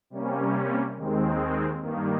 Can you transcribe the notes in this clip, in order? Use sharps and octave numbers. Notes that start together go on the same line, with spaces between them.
C3 G3 A#3 C#4
D#2 D#3 G#3 C4
G2 D#3 A#3